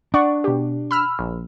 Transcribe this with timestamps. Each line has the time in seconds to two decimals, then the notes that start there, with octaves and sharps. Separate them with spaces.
0.14 D4 D5 F#5 C#6
0.44 B2 G4
0.91 B5 E6 F6
1.19 A#1